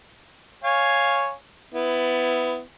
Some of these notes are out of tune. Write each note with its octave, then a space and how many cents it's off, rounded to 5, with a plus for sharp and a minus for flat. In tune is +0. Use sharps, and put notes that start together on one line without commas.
C#5 +0 F5 +0 G#5 +0
B3 +25 E4 +5